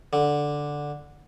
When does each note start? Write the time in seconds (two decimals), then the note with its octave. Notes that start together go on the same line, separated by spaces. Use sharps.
0.13 D3